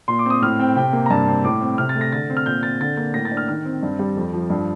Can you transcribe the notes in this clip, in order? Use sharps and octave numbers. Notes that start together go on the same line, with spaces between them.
A#2 C6
D6
C4 D#6
A2 F6
C4 G5
C3 G5
A#3
A#5
G2 A5
C4
A2 D6
C4
C3 F6
A6
A3
A#6
D3 A6
C4
F6
A#2 G6
C4 A6
D3 A6
A#3 A6
A2 A#6
A6
D4
F6
D#3 F6
C4
G2
G3
F2
F3
G2